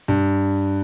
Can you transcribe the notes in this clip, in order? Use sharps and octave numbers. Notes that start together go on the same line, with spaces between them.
G2